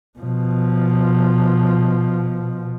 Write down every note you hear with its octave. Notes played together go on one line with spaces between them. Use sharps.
B2 F3